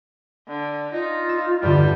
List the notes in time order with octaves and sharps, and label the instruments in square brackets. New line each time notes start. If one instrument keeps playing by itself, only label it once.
[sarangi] D3
[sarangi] D#4 [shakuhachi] F4
[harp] E6
[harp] E2 G2 D3 [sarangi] G3